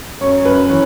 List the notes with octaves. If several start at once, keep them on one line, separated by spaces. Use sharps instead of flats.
F#2 C#5
F#2 B4
E3 C#5